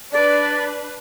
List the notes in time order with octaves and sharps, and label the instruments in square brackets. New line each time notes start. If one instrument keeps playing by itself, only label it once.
[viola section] D4 B4 [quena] D5